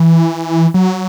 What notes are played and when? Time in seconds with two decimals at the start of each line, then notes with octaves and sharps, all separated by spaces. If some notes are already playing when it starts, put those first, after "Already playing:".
Already playing: E3
0.74 F#3